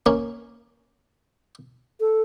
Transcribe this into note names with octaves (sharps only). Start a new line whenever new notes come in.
A#3 C#4
A4